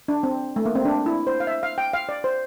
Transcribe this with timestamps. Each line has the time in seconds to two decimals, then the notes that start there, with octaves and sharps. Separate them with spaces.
0.08 D4
0.23 C4
0.56 A3
0.66 A#3
0.75 C4
0.85 D4
1.06 E4
1.27 C5
1.40 F5
1.47 E5
1.63 F5
1.78 G5
1.93 F5
2.09 D5
2.24 C5